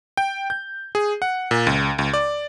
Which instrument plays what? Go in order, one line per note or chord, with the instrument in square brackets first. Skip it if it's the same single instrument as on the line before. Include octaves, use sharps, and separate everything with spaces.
[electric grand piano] G5
G6
G#4
F#5
A#2
C#2
C#2
D5